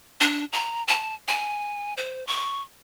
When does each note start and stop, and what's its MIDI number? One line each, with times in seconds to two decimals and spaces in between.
0.21 0.45 62
0.53 0.83 82
0.88 1.14 81
1.28 1.94 80
1.97 2.26 72
2.27 2.62 85